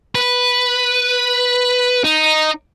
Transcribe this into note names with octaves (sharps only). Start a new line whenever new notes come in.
B4
D#4